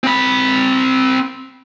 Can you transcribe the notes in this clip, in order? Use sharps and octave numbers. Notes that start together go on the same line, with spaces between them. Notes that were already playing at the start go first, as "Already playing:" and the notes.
C4 B5